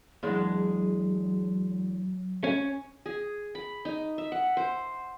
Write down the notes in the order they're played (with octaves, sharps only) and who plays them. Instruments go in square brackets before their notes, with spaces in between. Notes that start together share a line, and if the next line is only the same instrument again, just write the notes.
[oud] E2 G#3 D4 [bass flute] F#3
[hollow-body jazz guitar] C#4
[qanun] G#4
B5
D#4
E5
F#5
C5